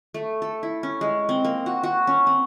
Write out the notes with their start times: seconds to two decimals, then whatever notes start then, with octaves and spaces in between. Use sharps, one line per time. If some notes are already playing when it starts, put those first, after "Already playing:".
0.14 A3
0.42 A4
0.63 E4
0.83 C#4
1.01 G#3
1.29 C4
1.45 A#3
1.66 F#4
1.83 F#4
2.07 C#4
2.27 C4